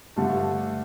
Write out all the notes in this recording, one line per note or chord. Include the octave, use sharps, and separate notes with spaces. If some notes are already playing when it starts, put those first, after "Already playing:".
G2 D3 A3